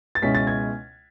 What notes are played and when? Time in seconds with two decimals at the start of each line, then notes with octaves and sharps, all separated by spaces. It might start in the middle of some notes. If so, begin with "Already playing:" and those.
0.15 A6
0.22 C#2 B2 G#3 C#4 E4 B6
0.35 A6
0.47 G#6